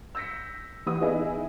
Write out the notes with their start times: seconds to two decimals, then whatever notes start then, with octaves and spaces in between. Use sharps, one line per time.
0.15 E6 G6 A#6 B6 C#7
0.86 E3 G4 F#5 D#6
1.01 B3 D#4 E4 G#4 D#5 E5